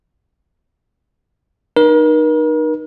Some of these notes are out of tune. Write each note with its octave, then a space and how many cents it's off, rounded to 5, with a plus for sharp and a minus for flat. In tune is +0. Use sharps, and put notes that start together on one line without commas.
D#4 -25 A#4 +40